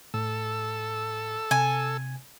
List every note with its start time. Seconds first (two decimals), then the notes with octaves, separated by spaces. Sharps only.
0.14 A2 A4 E6
1.51 C3 G#5